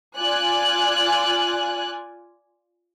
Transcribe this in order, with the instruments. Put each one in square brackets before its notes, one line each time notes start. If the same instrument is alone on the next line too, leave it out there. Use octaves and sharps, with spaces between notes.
[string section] F4 D5 G#5 F#6